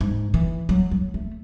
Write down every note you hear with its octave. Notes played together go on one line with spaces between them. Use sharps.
G#2
E3
F#3
F#3
A3